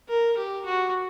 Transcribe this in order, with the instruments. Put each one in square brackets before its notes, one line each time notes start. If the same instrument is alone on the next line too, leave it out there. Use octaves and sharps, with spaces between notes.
[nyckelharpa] A#4
G4
F#4